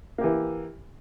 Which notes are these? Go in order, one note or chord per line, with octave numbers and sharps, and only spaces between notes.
E3 A#3 G4